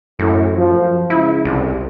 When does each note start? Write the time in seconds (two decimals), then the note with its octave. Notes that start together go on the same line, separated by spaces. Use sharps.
0.19 F#2 A2
0.56 F3
1.10 C#2 E4
1.45 C2